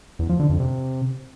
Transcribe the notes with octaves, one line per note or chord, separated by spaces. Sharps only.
E2
F3
D3
F2
C3